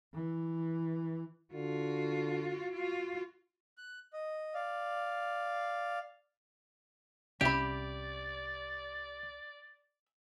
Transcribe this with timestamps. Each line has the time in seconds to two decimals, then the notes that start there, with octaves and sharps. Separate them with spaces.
0.14 E3
1.53 D3 F4 F#4
2.73 F4 F#4
3.78 F#6
4.13 D#5
4.54 D5 F5
7.41 C2 C3 C#4 G4 D5 E5 B5